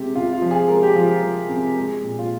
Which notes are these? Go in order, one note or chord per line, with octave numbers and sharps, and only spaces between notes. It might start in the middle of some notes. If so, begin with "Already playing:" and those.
Already playing: C3 G#3 G4
C3 F4
F4
F3
G#4
G#3 A#4
G4
F3 F4
F3
C3
G#3
A#2
F4